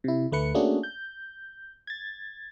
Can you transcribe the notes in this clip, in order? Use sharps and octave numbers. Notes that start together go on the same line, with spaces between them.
C3 E4
D2 A3 B4 C#7
A3 A#3 C#4 D4 F#4 G#4
G6
G#6 A6